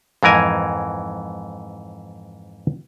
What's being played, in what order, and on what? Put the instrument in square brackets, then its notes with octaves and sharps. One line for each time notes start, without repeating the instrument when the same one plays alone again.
[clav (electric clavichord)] F2 G#2 E3 A#4 G#5